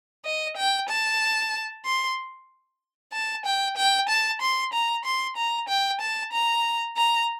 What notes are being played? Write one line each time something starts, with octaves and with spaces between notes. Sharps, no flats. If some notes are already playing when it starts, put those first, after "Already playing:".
D#5
G5
A5
C6
A5
G5
G5
A5
C6
A#5
C6
A#5
G5
A5
A#5
A#5